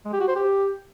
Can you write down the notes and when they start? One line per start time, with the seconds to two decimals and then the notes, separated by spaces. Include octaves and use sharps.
0.05 G#3
0.13 G4
0.21 F#4
0.28 C5
0.36 G4